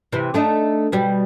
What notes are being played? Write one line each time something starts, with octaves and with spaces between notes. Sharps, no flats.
C3 E3
A3 D4 D#4
B2 G3